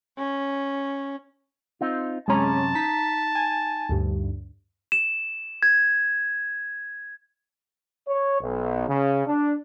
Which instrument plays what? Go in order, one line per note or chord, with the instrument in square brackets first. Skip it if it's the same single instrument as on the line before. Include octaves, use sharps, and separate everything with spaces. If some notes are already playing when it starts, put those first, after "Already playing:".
[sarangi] C#4
[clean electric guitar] C4 D#4 F4
[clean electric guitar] F#2 C3 A#5 [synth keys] G#3 C#4 [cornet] A5
[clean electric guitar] D#4 [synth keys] B6
[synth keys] G#5
D2 G2
[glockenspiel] E7
G#6
[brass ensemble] C#5
B1
C#3
D4